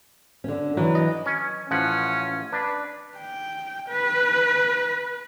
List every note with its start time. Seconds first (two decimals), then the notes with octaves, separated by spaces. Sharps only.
0.44 D3 C#4
0.77 E3 F#3
0.95 D#5
1.26 C#4
1.71 A1 F3 C#4 F#5
2.53 D4 B4
3.18 G5
3.89 B4